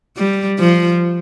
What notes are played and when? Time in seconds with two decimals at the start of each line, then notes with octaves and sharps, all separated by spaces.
0.17 G3
0.59 F3